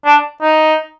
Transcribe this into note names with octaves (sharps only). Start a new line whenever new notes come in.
D4
D#4